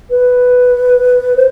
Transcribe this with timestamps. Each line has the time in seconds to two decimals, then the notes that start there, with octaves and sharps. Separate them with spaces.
0.10 B4
1.36 C5